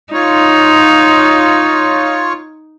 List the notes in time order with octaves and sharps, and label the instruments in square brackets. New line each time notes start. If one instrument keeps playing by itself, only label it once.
[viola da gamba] D#4 [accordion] F4 C#5